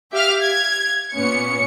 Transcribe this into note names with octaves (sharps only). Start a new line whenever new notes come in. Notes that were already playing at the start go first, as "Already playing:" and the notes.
G4 E5 F5 F6
G#6
A#2 B3 C#4 C#7